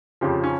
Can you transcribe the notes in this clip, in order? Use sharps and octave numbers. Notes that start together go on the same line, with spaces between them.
F2 C#3 F3 G4
C#4